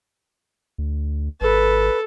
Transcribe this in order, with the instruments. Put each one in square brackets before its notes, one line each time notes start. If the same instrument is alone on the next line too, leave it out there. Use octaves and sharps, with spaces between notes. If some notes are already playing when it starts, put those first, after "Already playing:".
[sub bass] D2
[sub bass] G#1 [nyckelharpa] A4 [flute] B4